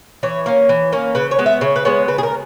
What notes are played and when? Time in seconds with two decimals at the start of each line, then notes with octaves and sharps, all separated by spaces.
0.23 E3 C#5
0.46 A#3 C#4
0.69 E3
0.93 A#3 C#4
1.15 C#3 B4
1.31 C#5
1.39 G#3 B3
1.46 E5
1.61 C#3 C#5
1.76 B4
1.85 G#3 B3 C#5
2.08 C#3 B4
2.18 G#4
2.23 A#4